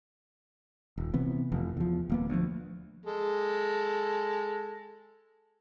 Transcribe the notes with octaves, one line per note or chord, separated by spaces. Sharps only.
D#1
C3 E3 B3
F1 E3
E2 F3
D#1 A#3 B3
D2 F3
G#3 A4